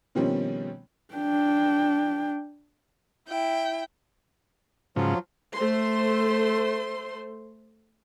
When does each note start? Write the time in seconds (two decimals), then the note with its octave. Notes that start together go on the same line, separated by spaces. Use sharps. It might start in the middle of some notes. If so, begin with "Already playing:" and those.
0.15 B2 D#3 F3 G3 C4 C#4
1.14 D4 G5
3.28 E4 G5
4.96 G#2 C#3 F3 F#3 F4
5.55 A3 C5 C6